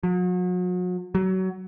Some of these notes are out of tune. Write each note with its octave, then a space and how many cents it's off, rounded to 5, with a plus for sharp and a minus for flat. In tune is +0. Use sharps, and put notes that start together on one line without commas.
F#3 -40
F#3 +25